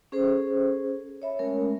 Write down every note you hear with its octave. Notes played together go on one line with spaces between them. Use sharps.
C#4 G#4 A4 C5
C#5 E5 B5
G#3 A3 C#4 A#4